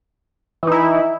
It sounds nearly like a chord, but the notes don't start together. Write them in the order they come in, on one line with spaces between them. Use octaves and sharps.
E3 D#4 E4